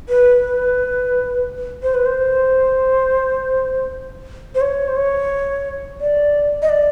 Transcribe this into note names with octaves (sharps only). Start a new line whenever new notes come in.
B4
B4
C5
B4
C5
C5
C#5
C5
C#5
D5
D#5
D5